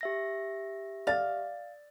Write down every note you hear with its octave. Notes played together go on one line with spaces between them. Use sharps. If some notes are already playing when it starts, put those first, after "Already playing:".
G4 E5 A#6
D5 F5 A6